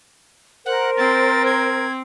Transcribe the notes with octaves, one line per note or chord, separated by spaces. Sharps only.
A#4 C5 F#5
C4 A6
G#6